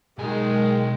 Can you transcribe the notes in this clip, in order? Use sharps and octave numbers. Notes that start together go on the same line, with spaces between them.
B1 D#3 G#3 G#5